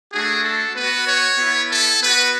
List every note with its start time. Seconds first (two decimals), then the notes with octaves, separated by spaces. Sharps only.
0.12 A3 D4 F#4 G#4
0.44 A4
0.76 B3 F#4 B4
1.07 C#5
1.39 B3 E4
1.71 A4
2.01 B3 F#4 B4